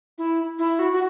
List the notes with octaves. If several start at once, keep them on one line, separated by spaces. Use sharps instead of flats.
E4
E4
F#4
F#4